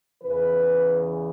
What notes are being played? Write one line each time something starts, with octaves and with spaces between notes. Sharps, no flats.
E2 C#3 E3 B4